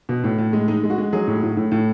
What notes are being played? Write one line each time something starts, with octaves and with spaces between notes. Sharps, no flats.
B2
A2
A2
G#3
G#3 D#4
G#3
F#4
G#3
F#3 G#4
A2
A2
A2
A2